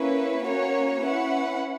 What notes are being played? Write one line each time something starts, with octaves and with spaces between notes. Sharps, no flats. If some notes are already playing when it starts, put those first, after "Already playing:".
Already playing: A#3 C#4 E4 B4
A#3 C#4 F#4 C#5
C#4 E4 B4 F#5